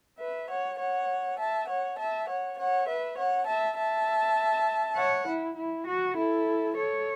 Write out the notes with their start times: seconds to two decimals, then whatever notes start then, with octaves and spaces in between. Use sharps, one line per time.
0.19 B4 E5
0.50 C#5 F#5
0.79 C#5 F#5
1.39 E5 A5
1.68 C#5 F#5
1.99 E5 A5
2.29 C#5 F#5
2.58 C#5 F#5
2.88 B4 E5
3.18 C#5 F#5
3.47 E5 A5
3.77 E5 A5
4.96 C#5 F#5
5.26 E4
5.57 E4
5.85 F#4
6.16 E4 A4
6.75 A4 C#5